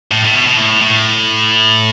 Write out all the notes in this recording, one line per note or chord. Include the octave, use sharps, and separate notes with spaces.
A2
A2
B2
B2
A2
A2